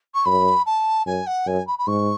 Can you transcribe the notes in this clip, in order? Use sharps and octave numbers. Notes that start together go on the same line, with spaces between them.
C#6
F#2 B5
A5
F#2 G#5
F#5
F#2 G#5
B5
B5
G#2 C#6